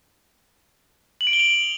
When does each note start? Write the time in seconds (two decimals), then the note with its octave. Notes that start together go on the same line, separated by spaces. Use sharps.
1.21 F#7
1.27 D7
1.33 G7
1.39 F7